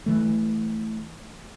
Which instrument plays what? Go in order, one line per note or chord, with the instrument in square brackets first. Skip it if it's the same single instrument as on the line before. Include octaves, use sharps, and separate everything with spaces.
[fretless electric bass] E3 A3